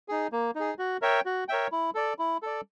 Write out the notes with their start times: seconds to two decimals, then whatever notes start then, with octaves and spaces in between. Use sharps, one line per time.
0.08 D#4 G#4
0.32 A#3
0.55 D#4 G#4
0.79 F#4
1.02 A#4 C#5 E5 G5
1.26 F#4
1.48 A#4 C#5 E5 G5
1.72 E4
1.95 A4 D5
2.19 E4
2.42 A4 D5